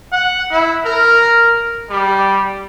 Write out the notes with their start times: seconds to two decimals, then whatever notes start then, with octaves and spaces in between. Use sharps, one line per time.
0.12 F#5
0.51 E4
0.85 A#4
1.90 G3